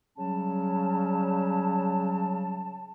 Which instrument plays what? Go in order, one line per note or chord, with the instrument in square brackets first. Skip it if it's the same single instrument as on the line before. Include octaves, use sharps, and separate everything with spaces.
[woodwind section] C#3 F#3 G3 C#4 A5